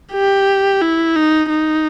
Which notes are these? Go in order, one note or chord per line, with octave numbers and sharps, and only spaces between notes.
G4
E4
D#4
D#4